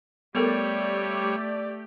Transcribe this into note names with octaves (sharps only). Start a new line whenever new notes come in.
G3 A3 B3 G4 A4 A#4 C#5 D5